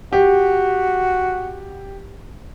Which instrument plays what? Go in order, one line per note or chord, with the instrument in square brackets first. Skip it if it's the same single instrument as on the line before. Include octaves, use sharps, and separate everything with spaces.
[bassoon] F#4 [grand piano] G4